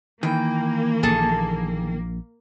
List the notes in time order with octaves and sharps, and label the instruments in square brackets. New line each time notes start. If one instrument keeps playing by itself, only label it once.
[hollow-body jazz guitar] D#3 E3 [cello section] A#3 [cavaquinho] G5
[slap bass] A#1 A#2 [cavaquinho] G#4 A4 A5